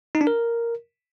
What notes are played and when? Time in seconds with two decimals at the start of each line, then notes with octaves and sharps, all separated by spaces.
0.15 D#4
0.21 D4
0.27 A#4